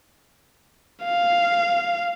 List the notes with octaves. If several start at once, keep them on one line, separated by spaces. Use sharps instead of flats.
F5